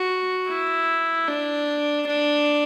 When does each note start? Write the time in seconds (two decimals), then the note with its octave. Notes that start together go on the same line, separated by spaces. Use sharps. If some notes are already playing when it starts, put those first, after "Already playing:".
Already playing: F#4
0.49 E4
1.28 D4
2.07 D4